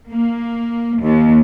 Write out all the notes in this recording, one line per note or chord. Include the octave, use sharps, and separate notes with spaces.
A#3
D#2